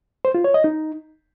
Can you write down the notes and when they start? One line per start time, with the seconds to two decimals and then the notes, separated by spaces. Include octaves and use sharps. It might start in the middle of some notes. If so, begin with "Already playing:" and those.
0.25 C5
0.35 F4
0.44 C#5
0.54 D#5
0.64 D#4